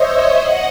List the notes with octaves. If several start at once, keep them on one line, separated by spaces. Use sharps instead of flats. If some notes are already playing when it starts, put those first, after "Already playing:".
Already playing: C5 C#5 D#5 E5
D#5 F#5